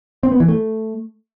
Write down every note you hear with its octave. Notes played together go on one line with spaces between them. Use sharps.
C4
B3
E3
A3